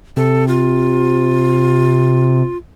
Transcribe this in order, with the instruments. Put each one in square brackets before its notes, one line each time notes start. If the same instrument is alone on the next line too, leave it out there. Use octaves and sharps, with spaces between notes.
[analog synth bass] C3 [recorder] A4
[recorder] F4